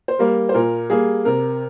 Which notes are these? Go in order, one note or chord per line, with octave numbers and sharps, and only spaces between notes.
C5
G3 A#3 A#4
C5
A#2 A#4
G3 A#3 G#4
C3 A#4